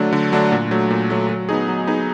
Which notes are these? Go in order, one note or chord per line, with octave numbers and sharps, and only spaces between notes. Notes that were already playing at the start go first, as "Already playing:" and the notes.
Already playing: D3 F#3 A3 D4
D3
F#3 A3 D4
A#2
F#3 A3
A#2
F#3 A3
F#3
B3 D#4 G#4
F#3
B3 D#4 G#4